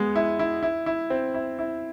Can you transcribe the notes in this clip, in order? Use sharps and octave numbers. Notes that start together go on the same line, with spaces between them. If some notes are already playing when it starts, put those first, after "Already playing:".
Already playing: G#3 B3
E4
E4
E4
E4
C4
E4
E4